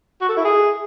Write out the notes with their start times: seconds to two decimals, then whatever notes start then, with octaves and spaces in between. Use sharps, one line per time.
0.21 F#4
0.29 A4
0.37 E4
0.45 G#4